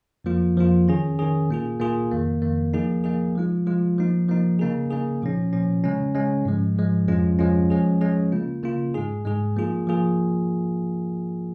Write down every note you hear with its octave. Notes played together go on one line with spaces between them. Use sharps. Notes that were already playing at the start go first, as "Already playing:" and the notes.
F2 F3 A#3 F4
F2 F3 A#3 F4
D#3 C#4 G#4
D#3 C#4 G#4
A#2 A#3 F4 G#4
A#2 A#3 F4 G#4
F2 D#3 A#3
F2 D#3 A#3
F3 A#3 D#4 G#4
F3 A#3 D#4 G#4
F3 G#3 F4
F3 G#3 F4
F3 A#3 D#4
F3 A#3 D#4
C#3 A#3 D#4 G#4
C#3 A#3 D#4 G#4
A#2 F3 C#4
A#2 F3 C#4
C#3 G#3 C#4
C#3 G#3 C#4
G#2 F3 G#3
G#2 F3 G#3
F2 F3 G#3 C#4 F4
F2 F3 G#3 C#4 F4
F3 G#3 C#4 G#4
F3 G#3 C#4 G#4
C#3 A#3 F4
C#3 A#3 F4
G#2 G#3 D#4 G#4
G#2 G#3 D#4 G#4
F3 A#3 F4 G#4
F3 A#3 F4 G#4